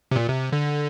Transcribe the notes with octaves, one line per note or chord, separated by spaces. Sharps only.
C3
A#2
C3
D3